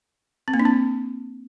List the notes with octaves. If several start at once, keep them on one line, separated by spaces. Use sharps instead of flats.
C4
A#3
D4
C4